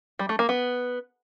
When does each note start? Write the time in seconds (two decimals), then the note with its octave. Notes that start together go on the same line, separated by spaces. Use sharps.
0.19 G3
0.29 A3
0.39 A#3
0.49 B3